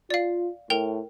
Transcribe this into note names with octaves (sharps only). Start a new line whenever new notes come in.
F4 D5 F5
A2 A#4 G5 F7